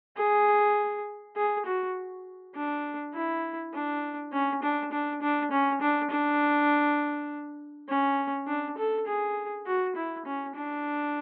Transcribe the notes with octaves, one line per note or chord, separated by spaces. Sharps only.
G#4
G#4
F#4
D4
E4
D4
C#4
D4
D4
D4
C#4
D4
D4
C#4
D4
A4
G#4
F#4
E4
C#4
D4